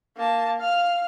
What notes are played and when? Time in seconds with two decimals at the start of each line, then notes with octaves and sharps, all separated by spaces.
0.17 A#3 A5
0.58 F5 F6